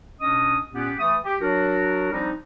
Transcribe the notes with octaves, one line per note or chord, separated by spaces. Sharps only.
B2 C#4 D4 D#5 D#6
A#2 B3 C#4 G4
E3 A3 D#6
G4
F#3 D4 F#4 A#4
F3 G3 C4 D4 D#4